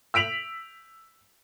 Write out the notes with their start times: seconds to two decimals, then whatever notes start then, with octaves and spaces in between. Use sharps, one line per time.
0.14 E6 B6 D7 F7 F#7